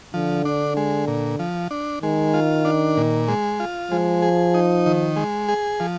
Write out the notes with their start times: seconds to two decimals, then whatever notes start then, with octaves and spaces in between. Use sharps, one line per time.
0.14 D3 F3
0.45 D4
0.77 G#3
1.07 A#2
1.39 F3
1.71 D4
2.02 D#3 G#3
2.34 F4
2.65 D4
2.97 A#2
3.28 G#3
3.60 F4
3.91 F3 G#3
4.22 G#4
4.54 D#4
4.86 D#3
5.16 G#3
5.48 G#4
5.80 F3